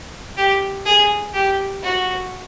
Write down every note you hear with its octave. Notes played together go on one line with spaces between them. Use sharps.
G4
G#4
G4
F#4